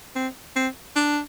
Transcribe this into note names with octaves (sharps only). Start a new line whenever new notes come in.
C4
C4
D4